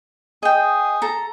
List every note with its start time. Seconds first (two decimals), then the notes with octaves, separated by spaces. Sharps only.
0.43 G#4 D#5 G5
1.02 A4 A#5